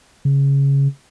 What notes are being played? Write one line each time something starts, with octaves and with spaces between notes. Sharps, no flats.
C#3